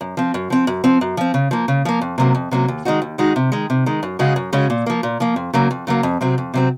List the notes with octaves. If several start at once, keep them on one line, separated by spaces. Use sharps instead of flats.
F#2
F3 C4
F#2
F3 C4
F#2
F3 C4
F#2
F3 C4
C#3
F3 A#3
C#3
F3 A#3
F2
C3 F#3 A#3 C#4
F2
C3 F#3 A#3 C#4
D#2
D#3 G#3 D#4 F#4
D#2
D#3 G#3 D#4 F#4
C3
D#3 G#3
C3
D#3 G#3
F#2
C#3 G#3 C#4 F#4
F#2
C#3 G#3 C#4 F#4
A#2
F3 A#3
A#2
F3 A#3
F2
C#3 F#3 A#3
F2
C#3 F#3 A#3
F2
C3 F#3 C4
F2
C3 F#3 C4